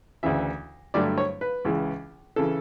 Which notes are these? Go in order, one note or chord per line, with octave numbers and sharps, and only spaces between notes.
D2 C#3 E3 E5
G2 D3 F#3 A3 D5
C#5
B4
C#2 C#3 E3
C#3 E3 A4